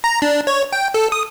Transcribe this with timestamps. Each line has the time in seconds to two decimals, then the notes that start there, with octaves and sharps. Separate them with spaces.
0.04 A#5
0.22 D4
0.47 C#5
0.73 G5
0.94 A4
1.12 D#6